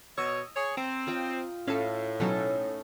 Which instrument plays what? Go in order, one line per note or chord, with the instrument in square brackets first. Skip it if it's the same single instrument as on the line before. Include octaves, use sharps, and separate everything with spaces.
[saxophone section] B2 C#5 [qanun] D#5 [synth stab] E6
[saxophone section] G#4 C#5
[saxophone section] C4 [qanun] A#5
[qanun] F4 D#5 G5
[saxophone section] A2 [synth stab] C#4 A4 [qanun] F5
[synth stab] B2 F#3 [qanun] C#4 D#4 A4